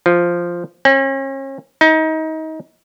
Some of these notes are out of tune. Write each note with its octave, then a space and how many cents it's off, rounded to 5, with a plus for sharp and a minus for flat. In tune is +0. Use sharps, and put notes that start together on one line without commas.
F3 -5
C#4 -40
D#4 +25